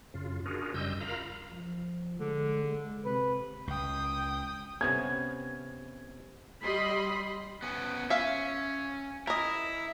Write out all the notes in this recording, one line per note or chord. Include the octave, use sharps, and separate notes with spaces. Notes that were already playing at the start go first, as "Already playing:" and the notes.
F#2 C#3 F4
D4 F4 F#4 G#4 A#4
F#2 C#3 G3 D#5 E6 G6
F4 A#4 F5 A#5 B5
F3
D3 G#3
G#3
C3 B4
C#2 G5 D#6
C3 B3 C#4 G#6
G3 D#5 B5 C6
B3 C#4
C#4 E5 F5
E4 A#4 D#5